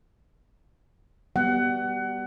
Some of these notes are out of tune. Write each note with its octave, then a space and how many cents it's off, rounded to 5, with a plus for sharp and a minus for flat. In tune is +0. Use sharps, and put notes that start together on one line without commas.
G3 +0 B3 -10 F#5 +25